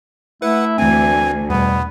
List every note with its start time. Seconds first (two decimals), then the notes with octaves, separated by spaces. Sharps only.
0.42 A3 E4 B4 F#5
0.78 D2 E3 C4 G#5
1.50 E2 B2 G3 B3